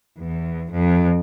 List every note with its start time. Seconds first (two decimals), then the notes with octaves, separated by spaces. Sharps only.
0.19 E2
0.72 F2